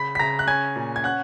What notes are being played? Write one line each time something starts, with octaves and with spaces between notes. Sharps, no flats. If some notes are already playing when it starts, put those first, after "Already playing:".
Already playing: C#3 B5 B6
B6
C#3 A#5 A#6
F#6
C#4 G#5 G#6
A#2
G#6
C#4 F#5 F#6